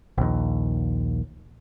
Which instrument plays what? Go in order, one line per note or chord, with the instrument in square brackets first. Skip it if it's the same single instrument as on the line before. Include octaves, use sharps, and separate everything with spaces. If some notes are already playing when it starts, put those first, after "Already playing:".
[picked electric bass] A#1 D#2